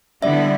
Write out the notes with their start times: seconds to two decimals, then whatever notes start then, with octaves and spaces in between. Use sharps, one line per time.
0.22 D3 G3 B3 E4 D5 E5